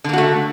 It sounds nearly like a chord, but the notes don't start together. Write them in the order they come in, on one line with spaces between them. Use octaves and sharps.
D3 A#3 F#4 A3